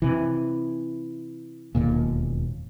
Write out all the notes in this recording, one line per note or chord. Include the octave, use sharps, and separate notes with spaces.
C3 E3
E1 D#2 A#2